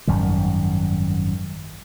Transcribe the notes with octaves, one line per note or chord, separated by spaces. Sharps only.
G#1 F#2 D#3 G3